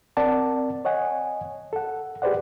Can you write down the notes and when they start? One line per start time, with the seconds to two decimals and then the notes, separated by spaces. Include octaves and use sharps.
0.17 C4 A#4 D5 F#5 A5
0.85 C#5 D#5 F#5 G#5
1.73 A4 F#5
2.22 G4 G#4 B4 C5 D5 F#5